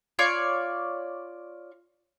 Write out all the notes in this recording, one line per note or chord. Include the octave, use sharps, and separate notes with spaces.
F4 C#5 D5